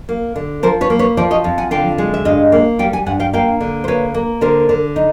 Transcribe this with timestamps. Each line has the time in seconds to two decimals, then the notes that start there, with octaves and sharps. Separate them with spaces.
0.09 A#3
0.36 D3
0.63 F3 A#4 C5
0.81 B4 C#5
0.90 A#3
0.99 B4 C#5
1.17 F3 C5 D5
1.31 C#5 D#5
1.44 F2
1.58 F#5 G#5
1.71 D3 F5 G5
1.98 G#3
2.14 E5
2.25 G2 D#5 F5
2.52 A#3
2.79 G3 F5 G5
2.93 F#5 G#5
3.06 G2 F#5 G#5
3.20 F5 G5
3.33 A#3 F5 G5
3.61 D3
3.84 C5
3.88 A#3 B4 C#5
4.14 A#3
4.41 D3 A#4 C5
4.69 D3
4.96 D#4